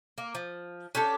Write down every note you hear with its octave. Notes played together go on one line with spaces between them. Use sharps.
A#3
F3
C#4 D4 G4 A4